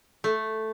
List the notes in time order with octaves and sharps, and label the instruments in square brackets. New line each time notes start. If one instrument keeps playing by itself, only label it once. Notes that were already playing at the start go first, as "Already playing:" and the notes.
[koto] A3